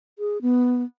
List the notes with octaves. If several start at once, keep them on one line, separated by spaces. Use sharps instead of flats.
G#4
B3